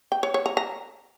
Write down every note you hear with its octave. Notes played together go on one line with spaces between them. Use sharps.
G5
C#5
C#5
A#5
A#5